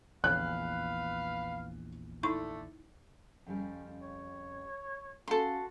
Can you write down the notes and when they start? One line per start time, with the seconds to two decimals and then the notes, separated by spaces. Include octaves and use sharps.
0.24 A#1 E2 B4 F5 F#6
2.23 D3 A3 D#4 E4 C#6
3.47 F2 C#3 G3 C#4
4.02 C#5
5.28 C#4 F#4 A4 F5 F#5 C6